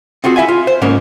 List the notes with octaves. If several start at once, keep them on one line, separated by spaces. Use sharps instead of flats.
C4 F4 F#4 G#4
E4 E5 F5 G#5
F4
C5
G#2 C#3 A#3 C#4